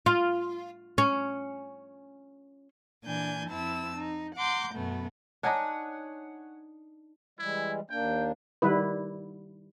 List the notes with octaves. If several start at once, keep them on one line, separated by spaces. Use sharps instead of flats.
F4
C#4
A#2 E3 D4 G#5 G6
F2 C4 E4 A5 E6
D#4
F#5 A#5 C6 D6 G6
F#2 B2 A3 B3
D4 D#4 C#5 F#5 G#5
E3 G3 G#3 E4
D#2 A#3 D4 G5
D#3 G3 E4 B4